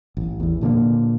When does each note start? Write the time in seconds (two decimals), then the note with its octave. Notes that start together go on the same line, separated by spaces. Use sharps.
0.17 A1
0.40 E2 E3
0.61 A#2 D3 F3 A#3